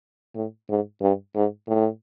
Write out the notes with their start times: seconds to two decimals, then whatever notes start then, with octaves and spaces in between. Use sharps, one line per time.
0.35 A2
0.69 G#2
1.01 G2
1.35 G#2
1.67 A2